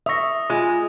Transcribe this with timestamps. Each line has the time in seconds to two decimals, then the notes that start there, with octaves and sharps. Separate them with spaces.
0.06 E5 C#6 D#6 A#6
0.50 G#3 F4